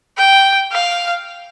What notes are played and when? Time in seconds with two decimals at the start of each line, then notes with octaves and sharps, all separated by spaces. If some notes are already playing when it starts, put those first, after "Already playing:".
0.18 G5
0.72 F5